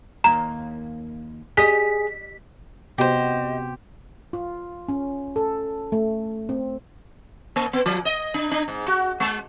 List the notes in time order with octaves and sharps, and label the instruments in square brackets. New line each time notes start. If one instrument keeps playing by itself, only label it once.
[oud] D#2 A#3 [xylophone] A#5
[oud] G4 D#5 [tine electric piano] G#4 [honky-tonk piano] B6
[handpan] C3 B3 F#4 [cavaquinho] G4 C5 [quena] D#5
[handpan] F4
C#4
A4
A3
C4
[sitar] A#3
B3
F3
D#5
D4
D4
G#2
F#4
G#3